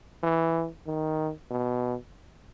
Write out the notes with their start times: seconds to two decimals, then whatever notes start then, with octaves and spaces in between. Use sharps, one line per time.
0.23 E3
0.86 D#3
1.51 B2